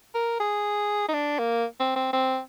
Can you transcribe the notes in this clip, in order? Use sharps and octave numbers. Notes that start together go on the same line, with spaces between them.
A#4
G#4
D#4
D4
A#3
C4
C4
C4